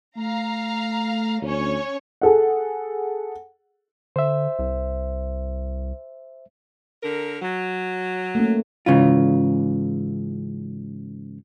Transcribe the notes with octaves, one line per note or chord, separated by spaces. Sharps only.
A3 F5 A#5
D2 C#4 C#5
G#4 A4 F#5
D3 C5 E5
C2
D3 A#4
F#3
A3 A#3 C#4
G#2 C#3 E3 F4